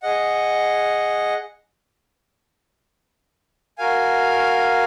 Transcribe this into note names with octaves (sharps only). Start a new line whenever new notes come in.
G#4 D#5 F#5
F#4 A#4 F5 G#5